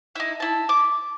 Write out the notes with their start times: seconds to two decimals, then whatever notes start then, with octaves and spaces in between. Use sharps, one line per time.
0.15 D#4 E4
0.40 E4 A5
0.69 D6